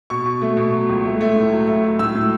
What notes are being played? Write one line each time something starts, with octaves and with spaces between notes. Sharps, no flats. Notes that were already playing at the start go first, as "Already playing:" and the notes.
B2 C#6
B2
A3
B2
F#3
C#2
A3
A3
A2
F#3
A3
F#3
A2 E6
A2